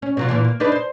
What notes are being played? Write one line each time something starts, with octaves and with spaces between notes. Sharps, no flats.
C#4
B2 F#3 F4
A#2 D3 E3
A#3
D4 D#4 B4
C5